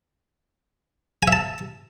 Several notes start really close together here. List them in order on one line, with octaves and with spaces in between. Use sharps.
G#5 E5 A5